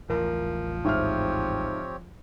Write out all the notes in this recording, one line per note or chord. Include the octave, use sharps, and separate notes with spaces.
A1 D#2 F3 A#4
G#2 C4 G4 C#5 E5 F6